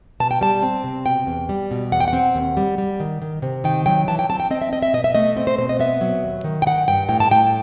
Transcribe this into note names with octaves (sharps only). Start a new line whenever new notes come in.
B2 A5
G5
G3 A5
C4
C3
B2 G5
E2
G3
B2
E2 F#5
G5
F#5
C4
D#2
G3
G3
D#3
D#3
C3
D#3 G5
F#3 G5
E3 A5
G5
C4 A5
G5
C4 D#5
E5
C4 D#5
E5
B2 D#5
E5
A3 D#5
C4 D#5
C5
B2 C5
D#5
B3 E5
F#3
D#2
D#3
G5
D#3 F#5
G2 G5
A2 G5
A5
A2 G5